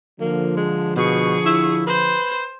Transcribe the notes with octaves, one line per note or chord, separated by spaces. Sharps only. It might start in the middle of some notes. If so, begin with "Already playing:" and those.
D3 F3 A#3
G#3
B2 G#4 C#6
E4
B4 C5